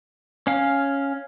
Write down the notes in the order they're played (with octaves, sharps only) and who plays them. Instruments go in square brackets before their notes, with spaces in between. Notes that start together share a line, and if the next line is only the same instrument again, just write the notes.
[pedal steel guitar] C#4 F5